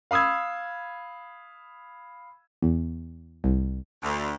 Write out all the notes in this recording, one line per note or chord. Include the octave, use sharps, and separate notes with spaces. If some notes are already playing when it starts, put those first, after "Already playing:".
F5 B5 D#6 E6 G#6
E2
C2
D2